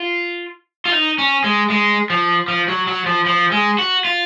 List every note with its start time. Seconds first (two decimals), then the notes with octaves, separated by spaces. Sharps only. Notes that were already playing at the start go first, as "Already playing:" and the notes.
Already playing: F4
0.85 F4
0.92 D#4
1.18 C#4
1.44 G#3
1.70 G#3
2.10 F3
2.48 F3
2.68 F#3
2.87 F#3
3.06 F3
3.26 F3
3.52 G#3
3.78 F#4
4.05 F4